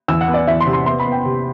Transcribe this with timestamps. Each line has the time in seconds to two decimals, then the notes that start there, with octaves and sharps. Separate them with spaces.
0.08 E2 E6
0.21 F#5
0.28 B3
0.34 D5
0.47 E2 E5
0.61 C6
0.67 C3
0.73 C6
0.86 B3 C6
0.99 B5
1.06 B3
1.12 G5
1.25 C3